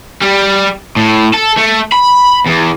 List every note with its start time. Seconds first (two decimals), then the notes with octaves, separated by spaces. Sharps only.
0.21 G3
0.96 A2
1.34 A4
1.57 A3
1.92 B5
2.46 E2